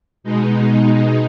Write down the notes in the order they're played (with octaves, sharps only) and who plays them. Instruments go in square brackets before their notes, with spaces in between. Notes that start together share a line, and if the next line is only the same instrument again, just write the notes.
[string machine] B2 G#3 D#4